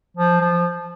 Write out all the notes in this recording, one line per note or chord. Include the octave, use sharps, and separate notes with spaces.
F3
F3